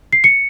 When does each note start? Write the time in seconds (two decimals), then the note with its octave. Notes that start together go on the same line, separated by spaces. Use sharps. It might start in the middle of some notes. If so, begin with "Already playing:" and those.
0.13 C7
0.24 C#7